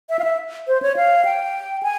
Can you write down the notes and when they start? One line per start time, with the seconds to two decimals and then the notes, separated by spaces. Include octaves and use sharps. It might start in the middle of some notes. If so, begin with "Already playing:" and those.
0.10 E5
0.19 F5
0.24 E5
0.67 C5
0.82 C#5
0.97 F5
1.25 G5
1.83 G#5